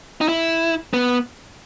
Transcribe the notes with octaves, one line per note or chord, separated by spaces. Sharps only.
D#4
E4
B3